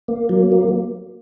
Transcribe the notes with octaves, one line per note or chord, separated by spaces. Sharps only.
A#3
F#3
A#3